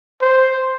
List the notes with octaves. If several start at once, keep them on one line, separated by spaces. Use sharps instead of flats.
C5